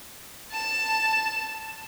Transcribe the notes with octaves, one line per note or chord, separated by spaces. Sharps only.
A5 E7